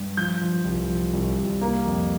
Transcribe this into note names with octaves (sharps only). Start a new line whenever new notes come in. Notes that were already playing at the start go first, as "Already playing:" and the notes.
Already playing: G2
F3 G6
F3
C2
F3
C2
C2
A#3
F2